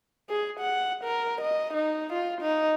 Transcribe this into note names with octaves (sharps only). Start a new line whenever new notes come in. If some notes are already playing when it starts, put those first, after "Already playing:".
G#4
F#5
A#4
D#5
D#4
F4
D#4